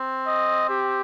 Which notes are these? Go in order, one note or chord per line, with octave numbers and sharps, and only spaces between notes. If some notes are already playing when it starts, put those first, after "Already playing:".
Already playing: C4
D#5
G4